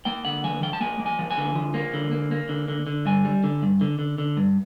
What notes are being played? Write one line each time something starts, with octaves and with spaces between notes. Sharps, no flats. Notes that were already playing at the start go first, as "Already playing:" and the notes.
A#3 G5
D3 F#5
F3 G#5
F3 G5
A5
A#3 G#5
A#3
G#5
F3
G#5
D3
F3
A#3
D3
A#3
A#3
D3
D3
D3
G2 G#5
G3
D3
G2
D3
D3
D3
G2